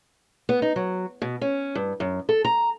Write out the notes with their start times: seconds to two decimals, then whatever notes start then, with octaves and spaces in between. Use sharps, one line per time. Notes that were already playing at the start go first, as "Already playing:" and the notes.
0.49 B3
0.62 D#4
0.76 F#3
1.22 B2
1.41 C#4
1.75 G2
2.00 F#2
2.29 A4
2.45 A#5